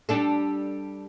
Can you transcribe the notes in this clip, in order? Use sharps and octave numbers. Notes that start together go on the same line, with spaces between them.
G3 D4 A4